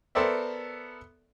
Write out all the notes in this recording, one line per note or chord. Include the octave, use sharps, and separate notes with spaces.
B3 A4 A#4 C5 D5 E5